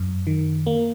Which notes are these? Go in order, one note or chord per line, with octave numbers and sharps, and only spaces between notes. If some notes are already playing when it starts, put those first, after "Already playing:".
Already playing: F#2
D#3
A#3